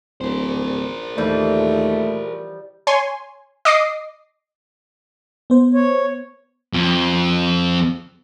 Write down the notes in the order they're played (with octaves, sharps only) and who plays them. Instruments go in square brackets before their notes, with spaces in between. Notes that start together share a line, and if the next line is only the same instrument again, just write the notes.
[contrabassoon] D1 [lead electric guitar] A#4 C5
[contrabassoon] D#2 [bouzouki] E3 F3 G3 [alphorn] A3
[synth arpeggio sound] C#5 G#5 C6
D#5 D6 D#6 A#6 C7
[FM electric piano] B3 C5
[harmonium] C#5
[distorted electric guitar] F2